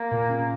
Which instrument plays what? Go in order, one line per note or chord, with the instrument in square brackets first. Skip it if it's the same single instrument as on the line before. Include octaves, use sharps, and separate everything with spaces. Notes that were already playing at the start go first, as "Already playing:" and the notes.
Already playing: [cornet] A#3
[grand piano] A#2
C#3